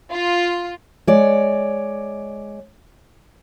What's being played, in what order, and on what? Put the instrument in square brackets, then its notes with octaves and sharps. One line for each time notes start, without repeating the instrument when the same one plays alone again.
[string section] F4
[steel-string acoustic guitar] G#3 C#5 D5